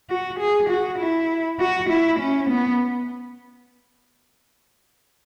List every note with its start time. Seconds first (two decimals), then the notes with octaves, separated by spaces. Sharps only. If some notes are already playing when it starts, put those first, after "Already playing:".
0.10 F#4
0.39 G#4
0.69 F#4
0.99 E4
1.60 F#4
1.89 E4
2.19 C#4
2.50 B3